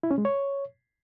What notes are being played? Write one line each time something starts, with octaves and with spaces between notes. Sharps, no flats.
E4
C#4
G#3
C#5